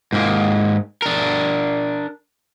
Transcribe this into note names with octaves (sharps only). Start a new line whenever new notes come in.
G#2 A#3
D4 A#4